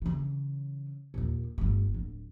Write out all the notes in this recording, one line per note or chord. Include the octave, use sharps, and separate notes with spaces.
C#3 E3
D#2 A#2
G1 A3
D1